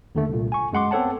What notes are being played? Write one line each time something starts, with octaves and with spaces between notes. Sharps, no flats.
D#2 D3 A3
C2 A#2
G#5 C#6
F#2 G#3 F#5 C6 D6
B3 C4 A4 C#5 F#5 A5